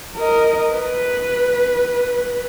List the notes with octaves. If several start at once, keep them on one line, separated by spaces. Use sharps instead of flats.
A#4 D#5
B4